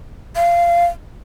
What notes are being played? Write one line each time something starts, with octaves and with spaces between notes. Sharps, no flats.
F5